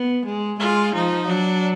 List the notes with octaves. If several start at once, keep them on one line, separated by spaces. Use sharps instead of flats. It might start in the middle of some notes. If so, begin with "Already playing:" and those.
Already playing: B3
G#3
G#3 F4
F3 D#4
F#3 D4